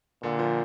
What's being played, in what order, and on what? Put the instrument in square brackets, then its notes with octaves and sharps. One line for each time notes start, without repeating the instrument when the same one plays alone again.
[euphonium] A#2 [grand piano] D3
[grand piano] F3